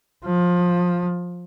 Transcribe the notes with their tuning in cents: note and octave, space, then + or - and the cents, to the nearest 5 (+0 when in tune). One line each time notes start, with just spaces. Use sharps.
F3 +20